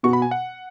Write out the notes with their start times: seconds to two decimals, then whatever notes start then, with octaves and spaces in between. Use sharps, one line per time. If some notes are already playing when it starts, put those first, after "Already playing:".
0.03 B2 B3 F#4 C#6
0.13 B5
0.22 G#5
0.31 F#5